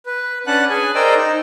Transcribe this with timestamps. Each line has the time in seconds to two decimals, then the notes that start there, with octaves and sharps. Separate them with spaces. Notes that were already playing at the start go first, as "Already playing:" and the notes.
0.06 B4
0.47 C#4 D4 B4 F#5 A5 F#6
0.70 G#4 G#5
0.95 A#4 C5 D5 D#5 G5 E6
1.16 D#4